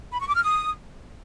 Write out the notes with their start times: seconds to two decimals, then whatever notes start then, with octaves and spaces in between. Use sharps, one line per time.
0.13 B5
0.20 C#6
0.27 D6
0.35 F6
0.42 D#6